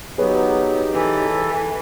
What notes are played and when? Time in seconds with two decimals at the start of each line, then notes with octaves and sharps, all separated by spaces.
0.18 F#3 B3 D#4 G4 G#4 B4 C#5
0.94 E3 A4